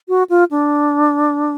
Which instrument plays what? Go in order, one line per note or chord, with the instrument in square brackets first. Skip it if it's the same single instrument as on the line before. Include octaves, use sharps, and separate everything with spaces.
[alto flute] F#4
F4
D4